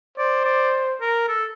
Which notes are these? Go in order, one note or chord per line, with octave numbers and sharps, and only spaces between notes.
C5 D5
D5
A#4
A4